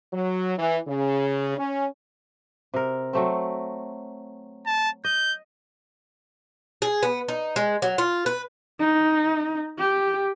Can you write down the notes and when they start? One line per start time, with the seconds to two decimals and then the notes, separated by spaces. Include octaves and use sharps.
0.13 F#3
0.58 E3
0.88 C#3
1.58 C#4
2.74 C3 A#4
3.13 F#3 A3 C4
4.66 A5
5.04 D#5 G6
6.82 G#4
7.03 B3
7.28 D#4
7.56 G#3
7.82 F#3
7.98 F4
8.26 B4
8.79 D#4
9.78 G4